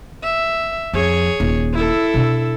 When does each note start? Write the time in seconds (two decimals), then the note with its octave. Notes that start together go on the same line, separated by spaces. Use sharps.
0.23 E5
0.93 F2 G#4 C#5
1.40 D#1
1.74 E4 A4
2.14 B2 D4